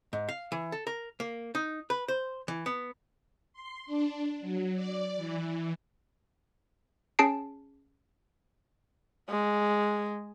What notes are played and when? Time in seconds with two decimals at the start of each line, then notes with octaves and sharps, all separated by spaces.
0.13 G#2
0.29 F5
0.52 E3
0.72 A4
0.87 A#4
1.20 A#3
1.55 D#4
1.90 B4
2.08 C5
2.48 E3
2.66 B3
3.53 C6
3.86 D4
4.40 F#3
4.75 D5
5.17 E3
7.19 C#4 G#4 A5 C7 D7
9.30 G#3